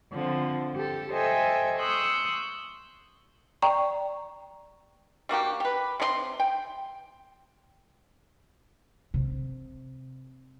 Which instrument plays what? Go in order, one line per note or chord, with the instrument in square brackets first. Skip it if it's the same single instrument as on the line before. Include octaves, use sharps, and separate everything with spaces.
[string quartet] D3 F3 C4
G4 A4
A4 C5 D#5 E5 G5 G#5
C6 C#6 D#6 E6 F#6 G6
[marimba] D5 G5 A#5 C#6
[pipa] G3 A#3 F#4 G4
G4 B4
C3 D#4 C6
G5
[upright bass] C3